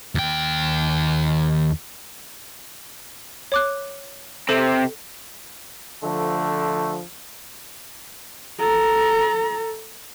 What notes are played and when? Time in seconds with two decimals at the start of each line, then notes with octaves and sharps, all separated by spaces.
0.15 D#2 G5
3.52 C#5 D6 F#6
4.49 C3 C4 A4
6.03 D3 F3 A3
8.59 A4 A#5